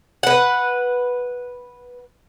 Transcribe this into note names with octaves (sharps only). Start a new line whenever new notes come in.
B4 F#5